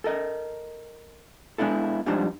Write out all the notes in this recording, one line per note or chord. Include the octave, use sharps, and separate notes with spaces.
A4 A#4 D#5
G#3 B3 D4 E4 A4
F2 G3 G#3 D4 D#4 C5